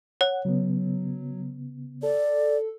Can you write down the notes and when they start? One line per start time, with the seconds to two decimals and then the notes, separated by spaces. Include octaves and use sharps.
0.21 C#5 F#5
0.45 C#3 F#3 B3
2.03 A4 D5